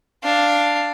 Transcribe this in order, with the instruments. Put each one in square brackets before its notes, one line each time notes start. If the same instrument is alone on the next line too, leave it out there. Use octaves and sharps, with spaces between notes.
[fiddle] D4 F5